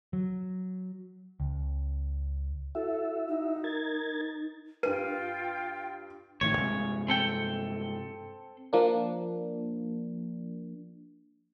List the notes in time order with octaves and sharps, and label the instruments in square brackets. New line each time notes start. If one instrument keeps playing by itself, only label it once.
[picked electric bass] F#3
C#2
[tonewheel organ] E4 F#4 E5 [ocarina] A4
[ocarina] D#4
[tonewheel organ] A#4 G#6 A6
[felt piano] G2 D#7 [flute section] F4 G5 [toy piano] B4
[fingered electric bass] A1 A2 D#3 [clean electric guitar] C#5
[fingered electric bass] G2 C3 G#3
[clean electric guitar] C4 A4 G5
[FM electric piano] F3 A#3 D4